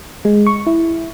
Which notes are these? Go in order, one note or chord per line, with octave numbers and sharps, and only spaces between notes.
G#3
C#6
E4